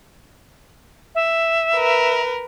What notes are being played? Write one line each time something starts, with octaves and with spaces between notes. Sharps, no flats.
E5
A#4 B4